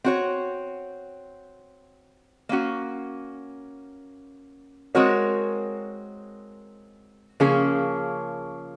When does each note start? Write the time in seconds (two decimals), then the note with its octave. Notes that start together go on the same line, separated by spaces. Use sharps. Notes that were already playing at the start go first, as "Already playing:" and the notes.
0.04 C4 F#4 C#5
2.49 A#3 C#4 F#4
4.95 G#3 C4 F#4 A#4 C#5
7.40 C#3 F3 A#3 C#4 G#4